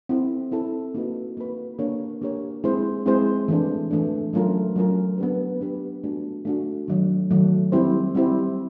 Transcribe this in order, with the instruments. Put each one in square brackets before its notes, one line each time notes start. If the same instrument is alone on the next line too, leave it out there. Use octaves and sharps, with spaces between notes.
[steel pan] C4 E4 A4
C4 E4 A4
A#3 D#4 F#4 B4
A#3 D#4 F#4 B4
A#3 D4 G4 A#4 C#5
A#3 D4 G4 A#4 C#5
G#3 C4 E4 G#4 C5
G#3 C4 E4 G#4 C5
E3 A3 D4
E3 A3 D4
F#3 A3 C#4 F4 A#4
F#3 A3 C#4 F4 A#4
B3 D4 G4 B4
B3 D4 G4 B4
A3 D4 F#4
A3 D4 F#4
D#3 F#3 A3
D#3 F#3 A3
G3 C4 E4 G4 C5
G3 C4 E4 G4 C5